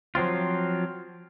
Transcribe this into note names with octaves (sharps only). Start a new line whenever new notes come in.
F3 F#3 C4 F4